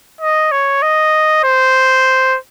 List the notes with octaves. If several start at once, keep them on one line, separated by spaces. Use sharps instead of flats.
D#5
C#5
D#5
C5